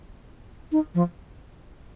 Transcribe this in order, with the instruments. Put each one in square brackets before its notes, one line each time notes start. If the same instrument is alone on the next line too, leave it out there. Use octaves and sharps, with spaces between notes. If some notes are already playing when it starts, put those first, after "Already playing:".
[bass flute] D#4
F3